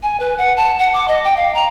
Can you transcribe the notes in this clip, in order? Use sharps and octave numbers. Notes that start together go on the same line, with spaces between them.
G#5
B4
F#5
A5
F#5
D6
D#5
G5
F5
A#5